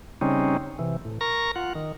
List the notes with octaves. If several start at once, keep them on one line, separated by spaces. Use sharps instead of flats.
C#3 G3 C4 C#4 D#4
C3 E3
A2
A#4 A#5 C#6 A#6
F4 F#5
D#3